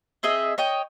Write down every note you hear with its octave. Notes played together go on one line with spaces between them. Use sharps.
C4 G#4 D#5 E5
C#5 D#5 G5